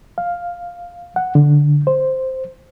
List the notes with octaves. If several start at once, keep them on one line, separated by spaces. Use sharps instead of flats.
F5
F#5
D3
C5